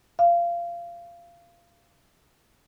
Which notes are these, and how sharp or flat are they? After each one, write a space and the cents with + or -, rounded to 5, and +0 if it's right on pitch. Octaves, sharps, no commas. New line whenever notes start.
F5 -20